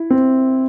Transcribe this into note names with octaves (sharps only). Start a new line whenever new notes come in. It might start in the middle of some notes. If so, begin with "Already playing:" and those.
Already playing: E4
C4